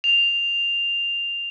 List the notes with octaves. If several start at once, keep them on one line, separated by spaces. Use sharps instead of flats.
F7